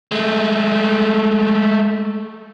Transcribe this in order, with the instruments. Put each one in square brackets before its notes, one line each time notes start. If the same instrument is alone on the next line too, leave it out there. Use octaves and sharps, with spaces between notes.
[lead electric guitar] G#3 A3